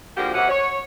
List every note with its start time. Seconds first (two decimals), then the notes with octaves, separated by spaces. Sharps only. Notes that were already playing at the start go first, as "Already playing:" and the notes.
0.16 D3 F3 A#3 F#4 G4
0.34 F#2 C3 C#4 F#4 F#5
0.49 C#5